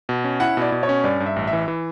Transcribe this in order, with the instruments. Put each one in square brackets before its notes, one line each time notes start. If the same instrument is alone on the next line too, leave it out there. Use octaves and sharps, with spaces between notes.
[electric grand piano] B2
C#4
[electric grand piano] E4 [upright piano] F#5
[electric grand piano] B2 [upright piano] D5
[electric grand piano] B2
[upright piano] C#5
[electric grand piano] C#4
[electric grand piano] G2 [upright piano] D5
[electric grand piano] G2
[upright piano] E5
[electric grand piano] A1
[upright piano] E5
[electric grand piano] E3
E3